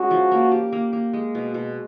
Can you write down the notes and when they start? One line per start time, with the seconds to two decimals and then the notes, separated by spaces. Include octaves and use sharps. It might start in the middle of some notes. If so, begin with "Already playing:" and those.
Already playing: G#3 C#4 F#4
0.11 F3
0.32 A#3
0.51 G4
0.72 A#3
0.93 A#3
1.13 G#3
1.35 B2
1.54 B2